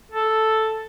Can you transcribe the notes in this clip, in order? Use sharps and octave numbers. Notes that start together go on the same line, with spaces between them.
A4